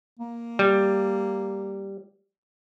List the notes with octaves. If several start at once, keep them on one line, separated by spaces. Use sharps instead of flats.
A#3
G3